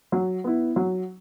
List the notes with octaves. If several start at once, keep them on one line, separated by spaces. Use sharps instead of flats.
F#3
B3 E4
F#3